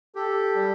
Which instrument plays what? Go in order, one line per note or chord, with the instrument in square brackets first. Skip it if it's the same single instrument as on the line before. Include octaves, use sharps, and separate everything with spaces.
[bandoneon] G4 [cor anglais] A4
[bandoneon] G3